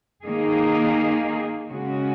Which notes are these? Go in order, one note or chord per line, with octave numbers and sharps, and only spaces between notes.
D#3 A#3 D#4 G#4
C#3 G#3 C#4 F#4